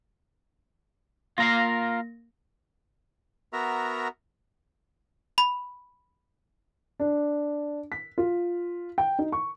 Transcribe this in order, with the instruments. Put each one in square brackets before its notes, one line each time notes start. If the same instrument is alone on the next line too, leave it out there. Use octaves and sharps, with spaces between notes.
[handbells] A#3 A#6 [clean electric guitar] F4 A#4 F5
[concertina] B3 F#4 A#4 E5 A#5
[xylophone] B5
[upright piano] D4
B6
F4
G5
D#4
C#6